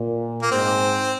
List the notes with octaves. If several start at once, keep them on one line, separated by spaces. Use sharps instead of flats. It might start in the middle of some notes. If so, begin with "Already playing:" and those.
Already playing: A#2
A#3
G#2 C4